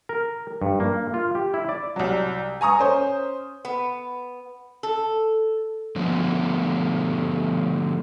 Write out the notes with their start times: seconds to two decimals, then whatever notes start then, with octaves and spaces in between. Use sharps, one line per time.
0.09 A#4
0.62 G2
0.80 A#3
1.14 F4
1.35 G4
1.54 E4
1.69 D5
1.96 C2 F#3
2.61 G#5 A#5 C#6 D#6
2.79 C#4 C5
3.65 B3
4.83 A4
5.96 D3 F3 A3 B3